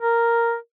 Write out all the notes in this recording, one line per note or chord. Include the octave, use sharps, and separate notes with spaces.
A#4